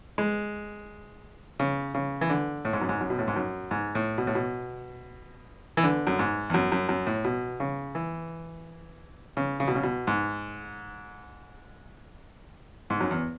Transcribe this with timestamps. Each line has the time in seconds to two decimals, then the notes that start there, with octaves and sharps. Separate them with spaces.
0.18 G#3
1.60 C#3
1.95 C#3
2.21 E3
2.30 D3
2.65 A2
2.73 G#2
2.81 F#2
2.89 G#2
3.00 F#2
3.10 B2
3.19 A2
3.28 G#2
3.36 F#2
3.71 G#2
3.95 A2
4.18 B2
4.27 A2
4.35 B2
5.77 E3
5.83 D3
6.07 F#2
6.19 G#2
6.50 E2
6.54 F#2
6.72 F#2
6.89 F#2
7.07 A2
7.25 B2
7.60 C#3
7.95 E3
9.37 C#3
9.60 C#3
9.68 B2
9.75 C#3
9.83 B2
10.07 G#2
12.90 G#2
13.00 F#2
13.11 E2